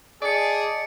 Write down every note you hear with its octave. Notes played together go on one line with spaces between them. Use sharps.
G#4 D5 D#5 A5 C#7 D7